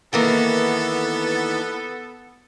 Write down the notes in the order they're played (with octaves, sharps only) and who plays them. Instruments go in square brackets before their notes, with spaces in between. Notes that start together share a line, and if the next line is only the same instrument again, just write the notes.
[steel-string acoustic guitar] D#3 E3 A#3 [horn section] B3 A4